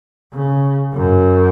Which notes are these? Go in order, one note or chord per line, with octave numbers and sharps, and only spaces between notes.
C#3
F#2